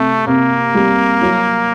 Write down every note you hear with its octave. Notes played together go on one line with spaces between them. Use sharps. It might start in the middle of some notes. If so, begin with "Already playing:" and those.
Already playing: C3 A3
C3 A#3
G3
F#3